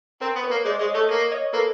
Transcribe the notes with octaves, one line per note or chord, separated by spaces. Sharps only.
C4 A#4 C5
B3
B4 C#5
A#3
G#3 C5 D5
G#3 C#5 D#5
A3 C#5 D#5
A#3 C#5 D#5
C#5 D#5
A#3 A4 B4